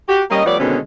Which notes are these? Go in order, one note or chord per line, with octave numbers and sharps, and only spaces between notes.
F#4 G4
G3 A#3 C#4 D#5
F3 G3 A3 B3 C#5 D5
B2 D3 D#3 G#3 C4 C#4